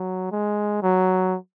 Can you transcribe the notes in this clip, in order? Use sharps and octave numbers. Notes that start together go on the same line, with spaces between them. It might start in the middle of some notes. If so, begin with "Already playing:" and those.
Already playing: F#3
G#3
F#3